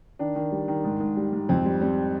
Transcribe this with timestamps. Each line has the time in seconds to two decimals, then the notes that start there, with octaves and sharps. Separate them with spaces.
0.19 D#3 D4
0.35 D#3
0.52 G3
0.68 D#3
0.84 G#2
1.00 G#2
1.17 G3
1.33 G#2
1.49 F2 C4
1.65 G3
1.81 G3 C4